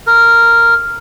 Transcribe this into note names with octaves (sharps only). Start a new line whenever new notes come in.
A#4